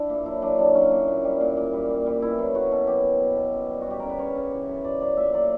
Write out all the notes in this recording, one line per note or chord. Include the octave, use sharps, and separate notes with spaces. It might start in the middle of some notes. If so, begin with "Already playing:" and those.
Already playing: D4 E4
A#2
F#3 E4
F#3 D4
F#3 D4
F#3 C#4
A#2
A#2
G3
A#2
A#2
G3
A#2
G3
B2 E4
F#3
F#3 F#4
B2
F#3 G4
B2
B2
B2
F#2
G3
F#4
G3 G4
C#3 A#4
B4
C#3 C#5
C#3
E3
F#2
F#3 D5
F#3 D5
A#2 E5
F#3 D5